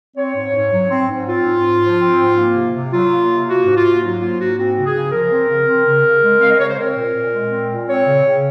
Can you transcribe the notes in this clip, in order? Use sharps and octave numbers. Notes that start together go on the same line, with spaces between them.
C4 C#5
G#2
G#2
F#3
C4
G#2
C4 F4
G#2
G#2
F3
C4
G#2
A#3
C3
C3
F#3 F4
A#3
C3
A#3 F#4
G#2
F4
G#2
F#3
A#3 F4
G#2 F#4
C4 F#4
C#3
G#4
C#3
F3 A#4
C4
C#3
C4
C#3
C#3
G#3
C4 F5
D#5
C#3 C#5
C5
C4 A#4
A#2
A#2
G#3
C4
A#2
C4 C#5
C#3
C#3